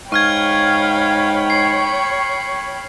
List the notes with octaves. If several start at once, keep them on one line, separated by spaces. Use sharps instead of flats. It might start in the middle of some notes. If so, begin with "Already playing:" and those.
G#2 C#5 F5 G5 B5 C#6 F6 G#6
C#6 C7